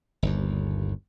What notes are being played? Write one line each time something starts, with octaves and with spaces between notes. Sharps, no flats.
G1 D#2